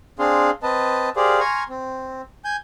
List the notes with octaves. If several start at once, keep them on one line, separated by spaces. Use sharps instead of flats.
C4 D4 G#4 F5 C6
C4 B4 D#5 A5
G4 G#4 A#4 C5 D5 F5
G#5 A#5 C6 C#6 F6
C4
G#5 G6